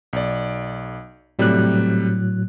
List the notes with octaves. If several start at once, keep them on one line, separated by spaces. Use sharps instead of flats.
B1 D5
A2 C3 F#3 G3 A3 F#6